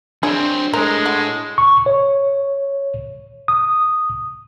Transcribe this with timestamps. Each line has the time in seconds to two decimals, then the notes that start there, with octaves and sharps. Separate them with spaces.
0.23 F#3 C4 D4 G#4
0.74 A2 G#3 A#4
1.06 F#4
1.58 C#6
1.86 C#5
3.48 D#6